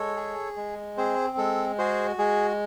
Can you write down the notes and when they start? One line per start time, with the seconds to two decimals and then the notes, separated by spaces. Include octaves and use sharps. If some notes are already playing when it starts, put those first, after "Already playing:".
Already playing: G#3 A4 C#5
0.16 G#4
0.56 G#3
0.97 C4 G#4 C5
1.37 G#3 A4
1.78 F#4 G#4 C5
2.18 G#3 G#4